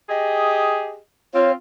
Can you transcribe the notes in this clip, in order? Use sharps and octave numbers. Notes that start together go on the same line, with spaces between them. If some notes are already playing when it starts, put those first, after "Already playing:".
G4 G#4 D#5
C4 F4 C#5